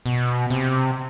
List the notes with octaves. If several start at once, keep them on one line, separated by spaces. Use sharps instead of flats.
B2
C3